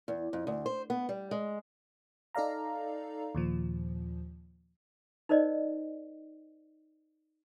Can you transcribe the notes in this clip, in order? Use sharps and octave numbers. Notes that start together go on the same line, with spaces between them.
E2
F2
D2
C5
B3
G3
G#3
D#4 A4 D5 F5 A#5
D#2 A#2 F3
D#4 A#4 C5 D5 D#5